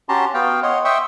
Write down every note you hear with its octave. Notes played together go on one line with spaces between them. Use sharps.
C#4 F#4 G4 A5 A#5 C6
B3 F#4 F5 G5
C#5 D#5 F#5 C6
E5 G5 C6 C#6 D#6 E6